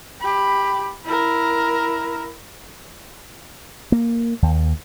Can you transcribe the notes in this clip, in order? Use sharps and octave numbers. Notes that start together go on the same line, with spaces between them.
G4 B5
E4 A#4
A#3
D#2